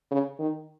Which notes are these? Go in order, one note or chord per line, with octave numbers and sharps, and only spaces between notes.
C#3
D#3